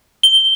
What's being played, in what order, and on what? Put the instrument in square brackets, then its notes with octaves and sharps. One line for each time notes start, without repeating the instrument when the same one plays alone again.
[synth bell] G7